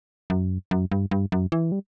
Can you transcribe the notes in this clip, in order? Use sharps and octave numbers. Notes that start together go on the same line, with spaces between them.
F#2
F#2
G2
G2
F#2
E3
G3